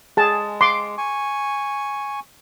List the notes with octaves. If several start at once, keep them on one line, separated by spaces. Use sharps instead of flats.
G#3 G#4 A5
C6 D6
G#5 C#6